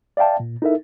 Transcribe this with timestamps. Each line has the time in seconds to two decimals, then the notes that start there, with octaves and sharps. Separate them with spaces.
0.17 D5 E5 F5 G5 A5
0.40 A#2
0.62 D#4 E4 A4 A#4 E5